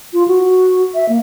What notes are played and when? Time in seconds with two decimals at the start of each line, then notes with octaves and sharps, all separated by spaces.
0.13 F4
0.28 F#4
0.95 E5
1.09 A#3